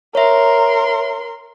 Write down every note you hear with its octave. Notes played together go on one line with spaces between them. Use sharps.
A#4 C#5 E5 C6